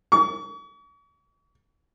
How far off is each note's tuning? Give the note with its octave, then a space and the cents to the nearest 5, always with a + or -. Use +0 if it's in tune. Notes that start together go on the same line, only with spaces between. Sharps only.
C#6 +40